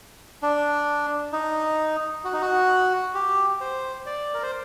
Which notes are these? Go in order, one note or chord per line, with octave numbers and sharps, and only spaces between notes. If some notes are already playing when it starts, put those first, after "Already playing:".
D4
D#4
F#4
D#4
F#4
G4
C5
D5
A#4
C5